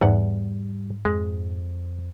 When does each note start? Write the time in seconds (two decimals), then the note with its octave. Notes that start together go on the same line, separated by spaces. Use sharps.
0.01 E2 G#2 G3 F#5
1.05 F2 G#3